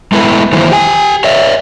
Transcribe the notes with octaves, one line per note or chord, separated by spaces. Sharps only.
G#3 A3 B3 E4 B4
D#3 E3 F#3 A#3 E4 C5
G4 G#5
C#5 D5 E5